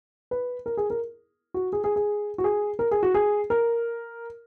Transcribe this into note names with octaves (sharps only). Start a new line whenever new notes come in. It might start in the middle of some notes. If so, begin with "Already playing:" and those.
B4
A#4
G#4
A#4
F#4
G#4
G#4
G#4
F#4
G#4
A#4
G#4
F#4
G#4
A#4